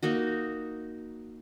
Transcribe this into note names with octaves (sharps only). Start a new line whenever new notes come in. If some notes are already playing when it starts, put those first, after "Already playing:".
A#3 D#4 F#4